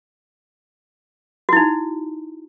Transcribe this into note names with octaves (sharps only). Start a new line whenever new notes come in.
D#4 E4 F#4